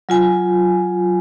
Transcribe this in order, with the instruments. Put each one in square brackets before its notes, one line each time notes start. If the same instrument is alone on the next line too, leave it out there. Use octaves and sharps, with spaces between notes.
[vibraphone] F#3 F4 G#5